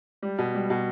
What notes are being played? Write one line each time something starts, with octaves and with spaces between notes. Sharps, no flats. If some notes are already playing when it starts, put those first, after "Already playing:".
G3
B2
G3
B2